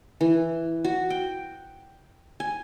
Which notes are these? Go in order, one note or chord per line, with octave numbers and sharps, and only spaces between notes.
E3
F#4
G5
G#5